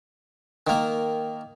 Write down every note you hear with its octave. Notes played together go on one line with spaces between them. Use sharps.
D#3 A#3